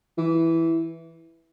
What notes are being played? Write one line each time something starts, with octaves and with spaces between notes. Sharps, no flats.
E3